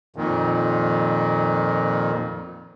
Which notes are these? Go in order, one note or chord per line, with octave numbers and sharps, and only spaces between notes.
F2 A#2 D#3